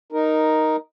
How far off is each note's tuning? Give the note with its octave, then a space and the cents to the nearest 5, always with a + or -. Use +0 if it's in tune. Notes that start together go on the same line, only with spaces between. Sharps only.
D#4 +0 A#4 +5